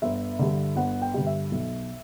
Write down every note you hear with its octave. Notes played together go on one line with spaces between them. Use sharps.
G1 E5
G2 D3
G1 F#5
G5
G2 D3
E5
B1